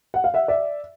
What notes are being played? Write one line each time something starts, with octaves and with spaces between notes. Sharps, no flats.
F#5
F5
E5 F#5
D5 E5